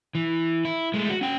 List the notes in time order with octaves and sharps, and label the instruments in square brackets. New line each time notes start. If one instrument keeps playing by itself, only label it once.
[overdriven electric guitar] E3
E4
G#3 A3
F#4
C#4 G5